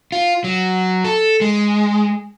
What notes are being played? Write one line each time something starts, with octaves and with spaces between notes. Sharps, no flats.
F4
F#3
A4
G#3